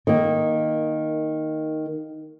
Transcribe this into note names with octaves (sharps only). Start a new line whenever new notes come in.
D#3 A#3